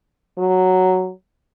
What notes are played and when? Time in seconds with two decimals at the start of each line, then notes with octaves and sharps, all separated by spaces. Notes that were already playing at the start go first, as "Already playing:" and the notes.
0.39 F#3